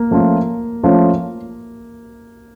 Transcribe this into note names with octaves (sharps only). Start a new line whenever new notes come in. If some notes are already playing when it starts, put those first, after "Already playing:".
Already playing: A#3
F3 A3 C#4 F4
F3 A3 C#4 F4